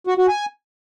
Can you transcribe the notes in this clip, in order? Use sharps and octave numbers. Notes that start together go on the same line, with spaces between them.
F#4
F#4
G#5